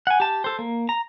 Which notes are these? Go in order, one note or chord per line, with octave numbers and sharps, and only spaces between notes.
F#5 G#5
G4 A5
A4 C5
A#3
A#5